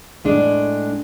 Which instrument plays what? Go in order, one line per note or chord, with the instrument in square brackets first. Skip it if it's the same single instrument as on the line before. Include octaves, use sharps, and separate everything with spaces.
[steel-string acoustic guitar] A2 G#3 D4